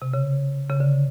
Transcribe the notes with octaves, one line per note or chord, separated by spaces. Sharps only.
C3
C#3
C#3
D3